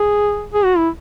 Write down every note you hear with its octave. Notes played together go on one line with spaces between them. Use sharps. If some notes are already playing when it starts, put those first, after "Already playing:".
Already playing: G#4
G#4
F#4
E4